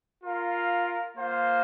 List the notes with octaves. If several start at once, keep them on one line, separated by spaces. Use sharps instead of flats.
F4 A#4 F5
A#3 F4 C5 F5